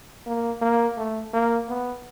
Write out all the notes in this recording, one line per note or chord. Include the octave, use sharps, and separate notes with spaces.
A#3
A#3
A3
A#3
B3